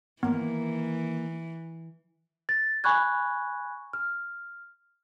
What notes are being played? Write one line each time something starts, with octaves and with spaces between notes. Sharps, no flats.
D#3 E3 A#3 B3
A6
G#5 B5 C#6 F#6 G#6
F6